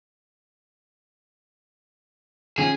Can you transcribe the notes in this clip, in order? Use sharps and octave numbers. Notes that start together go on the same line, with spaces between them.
D#3 F3 C#4 G#4